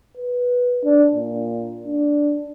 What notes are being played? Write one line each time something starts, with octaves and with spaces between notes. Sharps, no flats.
B4
D4
A#2
D4